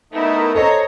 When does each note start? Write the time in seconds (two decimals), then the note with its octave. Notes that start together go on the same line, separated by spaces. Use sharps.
0.13 A3 B3 D#4 E4 A#4
0.55 A4 C5 C#5 D#5 A#5